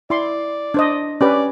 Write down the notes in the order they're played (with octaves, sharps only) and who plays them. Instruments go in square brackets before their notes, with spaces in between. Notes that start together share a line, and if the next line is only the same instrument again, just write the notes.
[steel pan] E4 C6 [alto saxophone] D5
[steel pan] D4 C5 D#5
[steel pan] C#4 G4 B4 [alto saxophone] D5